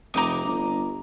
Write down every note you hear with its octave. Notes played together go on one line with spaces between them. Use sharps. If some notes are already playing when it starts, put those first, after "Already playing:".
F1 A#5 D6 D#6
G1